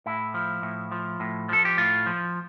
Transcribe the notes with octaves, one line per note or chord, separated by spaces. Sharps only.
A2 E4
F3
A2
F3
A2
F3 A4
G4
A2 F4
F3